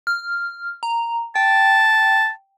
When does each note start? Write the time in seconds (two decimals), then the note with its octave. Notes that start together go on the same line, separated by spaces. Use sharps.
0.07 F6
0.83 A#5
1.36 G5 A5